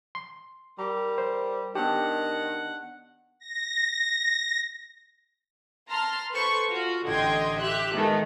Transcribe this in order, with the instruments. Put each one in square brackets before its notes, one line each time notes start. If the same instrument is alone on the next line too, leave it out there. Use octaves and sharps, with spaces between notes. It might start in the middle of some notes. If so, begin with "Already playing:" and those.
[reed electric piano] C6
[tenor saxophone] G3 [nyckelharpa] A#4 [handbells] A#5
[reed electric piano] C5
[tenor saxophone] D#3 [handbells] B3 D4 A5 [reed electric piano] G4 [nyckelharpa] F#5
[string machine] A#6
[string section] A5 A#5 C6 F6
A4 B4 C5 C#6
F4 F#4
A1 D3 D#5 G5 C6 G#6
G4 E5 F#6
D#3 G#3 A3 B3